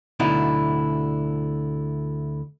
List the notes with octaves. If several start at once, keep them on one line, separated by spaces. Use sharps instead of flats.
D2 B2 D3 D#4 E4